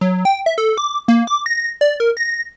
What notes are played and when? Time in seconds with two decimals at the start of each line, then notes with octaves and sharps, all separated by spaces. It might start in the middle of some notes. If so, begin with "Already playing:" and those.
0.01 F#3
0.25 G5
0.46 E5
0.58 A4
0.78 D6
1.08 A#3
1.27 D6
1.46 A#6
1.81 D5
2.00 A#4
2.17 A#6